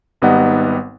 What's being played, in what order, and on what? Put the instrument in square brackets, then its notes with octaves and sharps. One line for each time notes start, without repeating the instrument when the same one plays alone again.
[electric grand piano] G#1 G3 B3 D#4 D#5 F#5